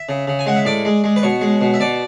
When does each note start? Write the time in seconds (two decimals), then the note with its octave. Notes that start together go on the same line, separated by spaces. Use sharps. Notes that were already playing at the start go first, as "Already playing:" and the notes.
Already playing: E5
0.09 C#3
0.27 C#3
0.39 G#5
0.46 G#3 F#5
0.56 E5
0.65 A2 D5
0.85 G#3
1.04 G#3
1.16 B4
1.23 B2 C#5
1.41 G#3
1.61 B2
1.74 E5
1.80 B2 D5